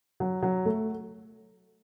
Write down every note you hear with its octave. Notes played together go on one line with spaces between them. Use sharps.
F#3
F#3
A3